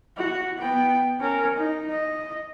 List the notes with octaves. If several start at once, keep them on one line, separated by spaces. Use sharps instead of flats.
F#4
B3 G5
C#4 A#4
D#4
D#5